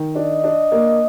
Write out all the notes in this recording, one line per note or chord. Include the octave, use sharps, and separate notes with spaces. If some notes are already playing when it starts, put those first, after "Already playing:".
Already playing: D#3
D4 D#5
D4
A#3